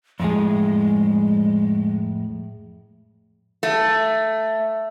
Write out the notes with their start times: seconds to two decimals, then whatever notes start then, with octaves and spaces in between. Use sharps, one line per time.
0.20 F2 A2 G#3 G#4
3.63 A3